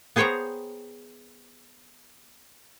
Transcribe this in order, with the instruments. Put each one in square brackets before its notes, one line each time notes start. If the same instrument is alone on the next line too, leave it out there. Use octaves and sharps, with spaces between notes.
[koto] B3 G#4 C5 C#5 G5 A#5